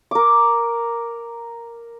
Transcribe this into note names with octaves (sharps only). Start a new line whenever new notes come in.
A#4 D6